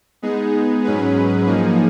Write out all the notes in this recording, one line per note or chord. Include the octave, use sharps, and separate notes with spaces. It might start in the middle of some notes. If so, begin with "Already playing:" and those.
G#3 B3 D#4 G#4
G#2 F#3 C#4 G#4 B4
F3 A#3 D#4 G#4